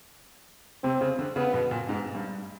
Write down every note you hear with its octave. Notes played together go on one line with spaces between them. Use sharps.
C3 C4
C#3
D3
C#3 B3
B2
A#2
G#2
G2